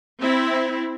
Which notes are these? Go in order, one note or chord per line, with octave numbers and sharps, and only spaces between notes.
C4 E4